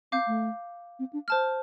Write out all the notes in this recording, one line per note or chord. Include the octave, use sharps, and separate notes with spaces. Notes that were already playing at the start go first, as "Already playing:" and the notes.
C4 F5 D6 G6
A3
C4
D4
C5 A5 F6